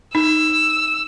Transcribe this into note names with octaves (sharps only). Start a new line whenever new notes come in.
D#4 E6